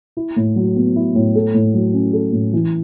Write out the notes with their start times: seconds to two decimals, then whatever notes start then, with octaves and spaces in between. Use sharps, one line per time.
0.17 E4
0.36 A2
0.56 F#3
0.76 B3
0.96 E4
1.15 A2
1.35 A4
1.54 A2
1.74 F#3
1.94 C#4
2.13 A4
2.33 A2
2.53 E3